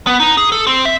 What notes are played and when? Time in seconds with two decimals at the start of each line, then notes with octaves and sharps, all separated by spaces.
0.07 B3
0.20 D#4
0.37 G#4
0.52 A4
0.67 C4
0.85 E5